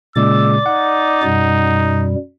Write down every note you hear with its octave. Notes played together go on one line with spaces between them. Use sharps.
A#2 C#3 G#3 D5 D6 E6
D#4 F#5
F#2 B2 G3